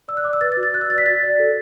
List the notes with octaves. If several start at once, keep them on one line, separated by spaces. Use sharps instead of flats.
D5 E6
F#6
D5 D6
E6
B4 A6
A6
F#4
A6
D5 F#6
E6
D5 A6
B6
F#4 A6
D5
A4